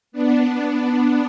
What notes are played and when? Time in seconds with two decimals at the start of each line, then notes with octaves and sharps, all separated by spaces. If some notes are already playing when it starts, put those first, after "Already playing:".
0.12 B3 D4